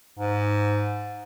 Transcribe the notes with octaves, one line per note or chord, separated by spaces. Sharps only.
G#2